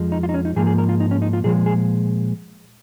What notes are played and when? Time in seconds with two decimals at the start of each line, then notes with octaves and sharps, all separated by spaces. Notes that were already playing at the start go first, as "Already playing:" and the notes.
Already playing: F2 F3 G#3
0.12 D#4
0.23 F4
0.29 D#4
0.34 C#4
0.45 D#4
0.56 G#2 F3 A#3 G#4
0.67 G#4
0.78 A#4
0.89 F4
1.00 D#4
1.11 C#4
1.22 D#4
1.33 F4
1.44 A#2 F3 G#3 G#4
1.66 G#4